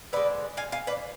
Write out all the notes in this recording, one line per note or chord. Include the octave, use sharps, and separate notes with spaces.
D3 G#3 B4 D5
F5 G#5
F5 G#5
B4 D5